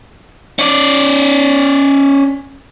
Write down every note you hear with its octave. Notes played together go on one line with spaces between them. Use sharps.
C#4 D5